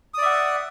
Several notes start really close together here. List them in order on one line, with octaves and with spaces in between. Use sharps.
D#6 D5 E5 F#5